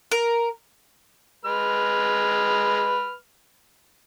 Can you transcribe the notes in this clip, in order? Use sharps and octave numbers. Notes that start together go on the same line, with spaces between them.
A#4
G#3 B4 F6